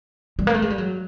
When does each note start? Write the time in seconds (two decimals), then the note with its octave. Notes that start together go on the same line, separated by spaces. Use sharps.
0.39 G3
0.47 A#3
0.54 A3
0.62 G#3
0.70 G3
0.78 F#3